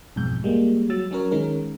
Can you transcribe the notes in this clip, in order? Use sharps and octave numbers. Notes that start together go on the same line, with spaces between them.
B1 F2 G#2 G6
G3 G#3 A#3
F#3 E6 A6
F#3 C#4 A#4 C#5
D#3 G#3 C#4 A#4